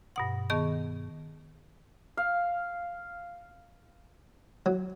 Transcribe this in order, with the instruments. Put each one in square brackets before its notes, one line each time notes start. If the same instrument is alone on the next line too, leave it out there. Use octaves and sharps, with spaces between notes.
[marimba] G2 B2 F#5
D#3 B3 G#4 D#5 A5 C#6
[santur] F5
[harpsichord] F#3